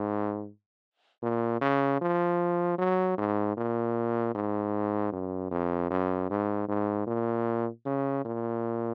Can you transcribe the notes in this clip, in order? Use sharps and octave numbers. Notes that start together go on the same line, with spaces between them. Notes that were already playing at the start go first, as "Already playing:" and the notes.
Already playing: G#2
A#2
C#3
F3
F#3
G#2
A#2
G#2
F#2
F2
F#2
G#2
G#2
A#2
C#3
A#2